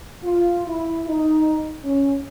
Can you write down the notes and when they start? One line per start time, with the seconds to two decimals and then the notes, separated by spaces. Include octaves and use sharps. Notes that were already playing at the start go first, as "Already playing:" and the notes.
0.24 F4
0.67 E4
1.09 D#4
1.84 C#4